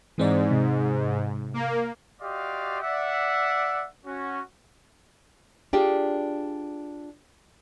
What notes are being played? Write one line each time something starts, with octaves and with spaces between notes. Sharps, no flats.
G#2 E3 C4 D5
C3
A#3
F#4 G4 D5 D#5 F5 C6
D5 E5 F#5
C#4 F#4
D4 F4 G4 G#4 D5